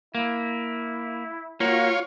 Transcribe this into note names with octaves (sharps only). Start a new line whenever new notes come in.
A#3 E4
A#3 F4 F#4 C#5